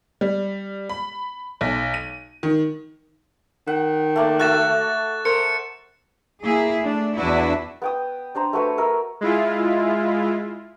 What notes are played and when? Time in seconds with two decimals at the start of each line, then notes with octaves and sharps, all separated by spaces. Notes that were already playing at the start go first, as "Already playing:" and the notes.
0.21 G3
0.89 B5
1.61 B1
1.94 D#7
2.43 D#3
3.67 D#3 F#5
4.16 A3 A#3 D5
4.40 A3 F#4 F#6 A6 E7
5.25 A#4 C5 C#7
6.42 A#3 E4 G#4
6.81 A3 D4
7.18 E2 D4 E4 F#4 B4
7.82 B3 G5 D#6
8.35 D4 C5 A#5
8.53 A3 F#4 B4 C#5
8.78 A#4 E5
9.21 G#3 E4 F4